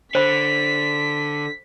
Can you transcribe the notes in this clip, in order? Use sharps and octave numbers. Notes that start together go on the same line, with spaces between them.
D3 C5 B5 B6